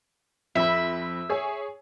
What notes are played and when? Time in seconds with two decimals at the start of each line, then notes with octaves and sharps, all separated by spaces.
0.55 F2 C4 E5 B5
1.30 G#4 C#5 G#5